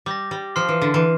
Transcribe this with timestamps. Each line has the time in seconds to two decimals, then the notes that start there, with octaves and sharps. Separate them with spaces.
0.06 G3 D6 G6 A#6
0.31 G3
0.56 F3 C6 F6 C7
0.68 E3
0.82 D3
0.94 E3